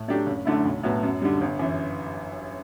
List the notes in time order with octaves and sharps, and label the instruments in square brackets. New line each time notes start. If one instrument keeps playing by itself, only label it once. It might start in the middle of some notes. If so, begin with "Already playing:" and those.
Already playing: [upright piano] A2
F#3 A3 D4 G4
F#1
F#2 D3 A3 E4
B1
A2 F#3 B3 F#4
F#2
D3 G3
G1
F#2 E3